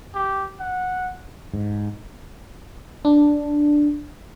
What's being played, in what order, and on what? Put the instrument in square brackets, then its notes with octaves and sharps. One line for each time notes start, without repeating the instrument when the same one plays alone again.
[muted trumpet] G4
F#5
[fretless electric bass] G#2
[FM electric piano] D4